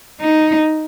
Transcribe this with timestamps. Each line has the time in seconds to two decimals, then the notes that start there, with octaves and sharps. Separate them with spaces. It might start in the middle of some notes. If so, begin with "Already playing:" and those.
0.21 D#4